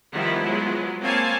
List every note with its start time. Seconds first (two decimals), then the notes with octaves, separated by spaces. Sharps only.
0.13 D#3 F3 G3 B3 E4
0.45 F3 F#3 G#3 B3
1.01 A#3 C4 C#5 F5 G#5 A5